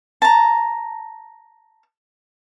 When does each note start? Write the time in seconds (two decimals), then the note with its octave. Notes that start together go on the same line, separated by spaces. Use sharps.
0.22 A5 A#5